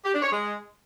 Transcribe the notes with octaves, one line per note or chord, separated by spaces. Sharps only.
G4
D4
C#5
G#3